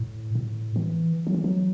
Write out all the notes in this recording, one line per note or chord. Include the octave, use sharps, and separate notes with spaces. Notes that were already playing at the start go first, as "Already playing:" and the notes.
Already playing: A2
A2
E3
F#3
E3
F#3